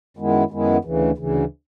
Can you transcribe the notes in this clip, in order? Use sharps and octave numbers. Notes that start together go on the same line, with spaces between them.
F#2 D#3 G#3 B3 E4
F#2 D#3 G#3 B3 E4
D2 C#3 E3
D2 C#3 E3